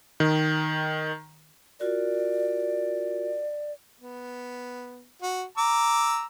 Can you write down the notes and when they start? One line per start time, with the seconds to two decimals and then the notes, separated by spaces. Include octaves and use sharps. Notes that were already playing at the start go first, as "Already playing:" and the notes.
0.20 D#3
1.80 F4 F#4 A#4 D5
4.00 B3
5.22 F#4
5.58 A#5 D6 E6